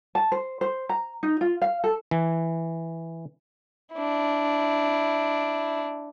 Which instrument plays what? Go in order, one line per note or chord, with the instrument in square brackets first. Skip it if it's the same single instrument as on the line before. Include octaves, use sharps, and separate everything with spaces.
[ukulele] A5
C5
C5
A#5
D#4
F4
F5
A4
[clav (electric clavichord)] E3
[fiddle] D4 E4